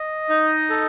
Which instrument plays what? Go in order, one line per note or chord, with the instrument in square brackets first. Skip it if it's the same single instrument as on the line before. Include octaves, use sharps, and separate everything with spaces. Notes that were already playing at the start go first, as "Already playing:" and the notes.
Already playing: [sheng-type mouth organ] D#5
D#4
A4